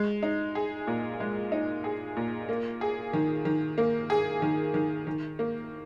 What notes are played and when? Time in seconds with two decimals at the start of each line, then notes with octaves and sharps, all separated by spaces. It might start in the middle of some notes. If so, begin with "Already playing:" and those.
Already playing: G#3
0.23 D#4
0.55 G#4
0.87 A#2
1.20 G#3
1.52 D#4
1.84 G#4
2.16 A#2
2.49 A#3
2.81 G#4
3.13 D#3
3.45 D#3
3.78 A#3
4.10 G#4
4.42 D#3
4.74 D#3
5.07 D#3
5.39 A#3